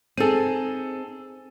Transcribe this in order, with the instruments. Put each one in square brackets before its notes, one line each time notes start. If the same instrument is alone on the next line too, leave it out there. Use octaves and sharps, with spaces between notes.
[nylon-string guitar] C4 D#4 G#4 [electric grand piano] A4 D#7